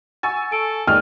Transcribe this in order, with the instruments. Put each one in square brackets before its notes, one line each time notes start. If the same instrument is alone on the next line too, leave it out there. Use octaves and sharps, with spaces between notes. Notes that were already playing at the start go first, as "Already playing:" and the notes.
[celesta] F#5 A6 [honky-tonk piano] G#5 C#6 E6
[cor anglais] A4 [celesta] D7
[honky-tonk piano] D#2 G#3 [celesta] D5 G5 [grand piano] F6